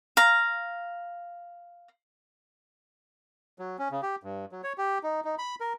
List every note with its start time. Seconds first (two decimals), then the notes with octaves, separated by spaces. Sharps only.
0.17 F5 A#5
3.59 F#3
3.79 C#4
3.91 C#3
4.03 G4
4.23 G2
4.52 F#3
4.64 C#5
4.78 G4
5.03 D#4
5.24 D#4
5.38 B5
5.60 A#4